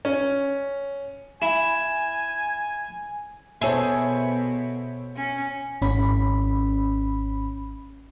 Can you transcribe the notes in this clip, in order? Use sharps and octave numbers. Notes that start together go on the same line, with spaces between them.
C#4
E4 G#5
B2 G#4 A4 C5 C#5 E5
C#4
G#1 C#4 B5